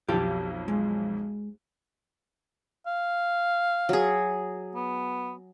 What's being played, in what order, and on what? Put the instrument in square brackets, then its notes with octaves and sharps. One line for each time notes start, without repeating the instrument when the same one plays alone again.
[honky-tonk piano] B1 F2 [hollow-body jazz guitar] G4 A5
[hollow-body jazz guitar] G#3
[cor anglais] F5
[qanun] F#3 G#4
[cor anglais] B3